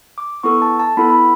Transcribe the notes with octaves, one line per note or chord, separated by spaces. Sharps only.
D6
B3 E4 A4 C#6
A5
A5
B3 E4 A4 B5
B5